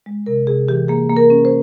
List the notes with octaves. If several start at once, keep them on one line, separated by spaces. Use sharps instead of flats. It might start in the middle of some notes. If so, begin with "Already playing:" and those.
G#3
C3 A#4
C3 G#4
E3 G4
A#3 G#4
A#3
A#4
C#4
C5